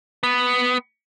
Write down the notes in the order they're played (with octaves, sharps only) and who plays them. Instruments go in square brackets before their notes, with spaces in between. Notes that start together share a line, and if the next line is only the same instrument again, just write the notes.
[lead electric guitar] B3